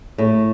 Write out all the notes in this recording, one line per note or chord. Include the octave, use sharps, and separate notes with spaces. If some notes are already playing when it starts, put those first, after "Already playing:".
A2